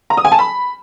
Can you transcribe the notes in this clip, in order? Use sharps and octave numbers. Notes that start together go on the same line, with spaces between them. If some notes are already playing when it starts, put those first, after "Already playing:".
A#5
D#6
G#5
A5
B5